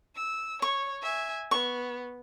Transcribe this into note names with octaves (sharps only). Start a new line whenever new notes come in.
E6
C#5 C#6
E5 G#5
B3 C#6